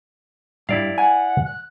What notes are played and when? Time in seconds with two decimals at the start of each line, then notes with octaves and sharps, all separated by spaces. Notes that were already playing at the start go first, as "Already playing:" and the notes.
0.69 G2 E4 D5 F5
0.98 F#5 G#5
1.45 F#6